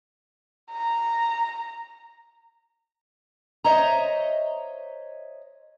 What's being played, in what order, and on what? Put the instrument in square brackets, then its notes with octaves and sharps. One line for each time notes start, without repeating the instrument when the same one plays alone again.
[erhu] A#5
[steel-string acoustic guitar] C5 C#5 D#5 E5 A#5